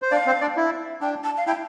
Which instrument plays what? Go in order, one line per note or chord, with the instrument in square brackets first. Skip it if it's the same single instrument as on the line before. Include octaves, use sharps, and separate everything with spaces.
[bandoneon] C5
[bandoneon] D4 D5 [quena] F5
[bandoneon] C4 C5
D4 D5
E4
[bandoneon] D4 [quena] G5
[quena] A5
F5
[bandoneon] E4 [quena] G5